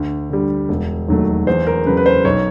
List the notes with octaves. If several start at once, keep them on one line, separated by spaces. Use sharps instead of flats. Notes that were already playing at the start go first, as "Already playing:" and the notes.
Already playing: D2
D3 G3
E1
D#2 D#3 F#3 A3
E2 C5
A#4
C#3 F#3 B4
B4
C5
B1 C#5